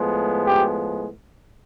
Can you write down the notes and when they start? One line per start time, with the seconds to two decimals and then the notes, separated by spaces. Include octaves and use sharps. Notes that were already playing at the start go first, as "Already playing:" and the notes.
Already playing: A2 F3 G#3 B3
0.46 G4